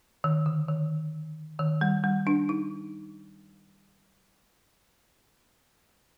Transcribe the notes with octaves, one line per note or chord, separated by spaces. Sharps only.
D#3
D3
D#3
D#3
G3
G3
D4
D#4